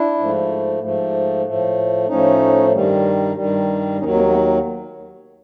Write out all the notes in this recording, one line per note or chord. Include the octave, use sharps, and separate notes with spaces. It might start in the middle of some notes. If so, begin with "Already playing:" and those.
Already playing: D4 E4
G#2 F3 A3
G#2 F3 A3
A2 F3 A3
A2 F3 A3 C#4 D#4
G2 D#3 G3
G2 D#3 G3
D#2 D#3 F#3 C#4 D#4
A#3 C4
A3 B3